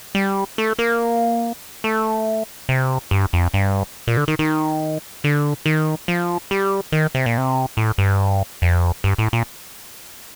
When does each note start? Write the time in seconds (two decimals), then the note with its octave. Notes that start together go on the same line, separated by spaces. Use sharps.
0.15 G3
0.58 A3
0.79 A#3
1.84 A3
2.69 C3
3.11 G2
3.33 F2
3.54 G2
4.07 A#2
4.17 D3
4.28 D#3
4.39 D#3
5.24 D3
5.66 D#3
6.08 F3
6.51 G3
6.92 D#3
7.15 C3
7.26 A#2
7.38 C3
7.77 A2
7.98 G2
8.62 F2
9.04 G2
9.18 A2
9.33 A#2